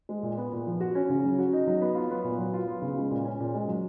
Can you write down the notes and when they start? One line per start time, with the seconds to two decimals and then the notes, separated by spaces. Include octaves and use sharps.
0.09 G#3
0.23 A#2
0.38 B3
0.52 A#2
0.67 F3
0.80 F#4
0.95 C#4
1.09 C#3
1.24 F#3
1.39 F#4
1.53 D#4
1.67 F#3
1.81 B3
1.95 F4
2.11 B3
2.24 A#2
2.38 F#3
2.54 F4
2.68 B3
2.82 C#3
2.97 G#3
3.10 A#2
3.25 C#4
3.40 A#2
3.55 G#3
3.68 F#3